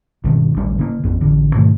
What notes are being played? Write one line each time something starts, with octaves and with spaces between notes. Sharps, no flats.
C#2 G2 B2 D#3
D1 A1 G3 D4
C#3 A#3
A1 F2 B3
A1 D3
G#2 B2 D#3 A3